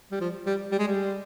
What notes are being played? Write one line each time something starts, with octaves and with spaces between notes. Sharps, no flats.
G3
F3
G3
G3
G#3
G3